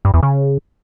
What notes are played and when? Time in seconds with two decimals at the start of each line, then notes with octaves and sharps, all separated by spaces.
0.05 G2
0.14 E2
0.23 C#3